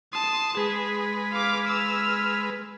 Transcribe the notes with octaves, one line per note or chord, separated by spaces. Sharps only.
A5 C6 D#6
G#3 G#4 B4
F5 D6
E6 F6